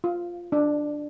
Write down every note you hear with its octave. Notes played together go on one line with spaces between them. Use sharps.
F4
D4